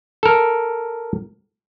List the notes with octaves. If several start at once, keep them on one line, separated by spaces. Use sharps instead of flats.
A4 A#4